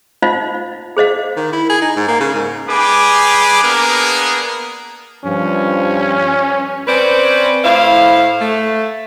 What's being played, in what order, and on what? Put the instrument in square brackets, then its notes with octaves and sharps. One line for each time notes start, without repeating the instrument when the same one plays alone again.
[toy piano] D#4 F4 C5 D#5 F5
G#4 C5 D#5 F5
[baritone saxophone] D#3
E4
G#4
D#4
G#2
A#3
C#3
G#2
[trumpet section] G3 G#4 B4 D6
A#3 B3 D4 G#4 A#4
[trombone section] G2 F3 [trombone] C#4
[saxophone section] C4 C#4 B4 C5 D5
A2 E4 C5 F5
A3